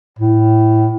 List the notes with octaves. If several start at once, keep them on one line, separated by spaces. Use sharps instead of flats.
A2